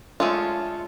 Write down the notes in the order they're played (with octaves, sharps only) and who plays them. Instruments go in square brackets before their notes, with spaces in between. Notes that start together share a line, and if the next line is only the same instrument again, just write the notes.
[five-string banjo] G#3 A3 C#4 D4 F4